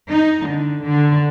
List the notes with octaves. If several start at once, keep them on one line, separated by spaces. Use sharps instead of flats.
D#4
D3
D3